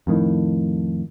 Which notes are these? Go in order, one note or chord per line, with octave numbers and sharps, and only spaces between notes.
F2 A2 D#3